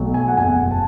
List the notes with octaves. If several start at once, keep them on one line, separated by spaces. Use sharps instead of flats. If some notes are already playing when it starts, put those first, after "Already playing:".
Already playing: B1 B2 F#3 A3
G#5
F#5
F#1 E2 B2 G#5
A5